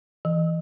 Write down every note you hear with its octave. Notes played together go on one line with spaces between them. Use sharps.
E3